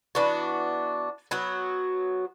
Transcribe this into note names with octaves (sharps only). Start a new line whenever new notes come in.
E3 B3 D4 F#4
F#3 B3 F#4